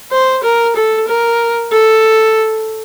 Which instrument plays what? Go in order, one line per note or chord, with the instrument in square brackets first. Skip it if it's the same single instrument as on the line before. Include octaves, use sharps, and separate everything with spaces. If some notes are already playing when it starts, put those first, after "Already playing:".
[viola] C5
A#4
A4
A#4
A4